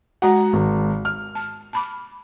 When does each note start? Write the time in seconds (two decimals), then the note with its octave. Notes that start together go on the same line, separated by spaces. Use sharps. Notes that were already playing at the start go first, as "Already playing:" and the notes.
0.22 G#3 F#4 F#5 A#5
0.53 G#1
1.05 F6
1.35 A5
1.73 A5 B5 D6